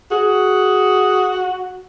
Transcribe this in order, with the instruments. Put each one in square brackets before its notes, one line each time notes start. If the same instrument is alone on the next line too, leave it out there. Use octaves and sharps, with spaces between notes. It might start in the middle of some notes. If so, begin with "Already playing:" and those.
[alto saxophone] F#4 [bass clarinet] G#4